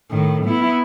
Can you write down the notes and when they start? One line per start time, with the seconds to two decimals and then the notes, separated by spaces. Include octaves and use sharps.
0.11 A2 D#3
0.45 B3 E4